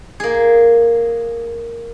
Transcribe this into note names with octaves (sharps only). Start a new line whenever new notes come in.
A#3 G#4